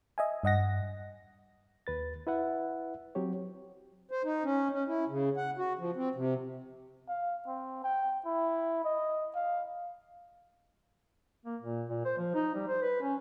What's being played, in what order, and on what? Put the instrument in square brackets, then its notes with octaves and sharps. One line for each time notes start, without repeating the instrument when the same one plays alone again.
[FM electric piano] D#5 E5 G#5
G2 D#5 F#5 A#6
[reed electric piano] D#2 B4 A6
E4 B4 E5 F#5
F#3 C4 G4 C#5
[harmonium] C5
D#4
C#4
C#4
E4
C#3
F#5
F#4
F3
C4
C3
[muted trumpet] F5
C4
G5
E4
D#5
F5
[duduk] A#3
A#2
A#2
C5
F3
D#4
G3
C5
B4
C#4